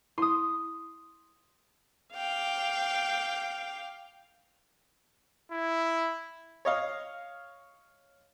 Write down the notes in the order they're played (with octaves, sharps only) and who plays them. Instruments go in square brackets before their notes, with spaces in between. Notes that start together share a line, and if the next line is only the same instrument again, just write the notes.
[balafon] E4 [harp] C6 D#6
[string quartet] F5 G5 D6
[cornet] E4
[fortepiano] C#5 D#5 F5